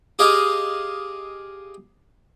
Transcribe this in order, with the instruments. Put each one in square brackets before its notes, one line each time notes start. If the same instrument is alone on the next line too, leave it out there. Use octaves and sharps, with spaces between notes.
[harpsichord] G4 G#4 D#5 F5